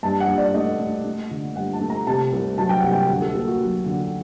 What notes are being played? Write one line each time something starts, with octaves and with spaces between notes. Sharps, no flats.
G2 A5
F#5
G2
D5
A3 D#5
A3
A3
D3
G2 F#5
A5
A3
A#5
C3 A5
C2
F#3 A5
G5
C2 F#5
G5
D2 F#5
A4
A#3 A4
F#4
F#3
D3